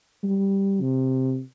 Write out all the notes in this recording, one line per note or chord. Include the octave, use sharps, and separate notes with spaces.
G3
C3